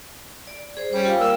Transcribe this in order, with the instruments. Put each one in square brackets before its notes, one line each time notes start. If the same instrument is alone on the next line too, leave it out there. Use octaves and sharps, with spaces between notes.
[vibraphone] D5
G#4 C5
[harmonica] G3 C#4 [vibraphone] C5
[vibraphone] F4 F5 G5
[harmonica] A#3 E6